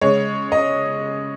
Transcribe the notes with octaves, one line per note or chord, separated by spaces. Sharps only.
C#3 G#3 C#5
D#5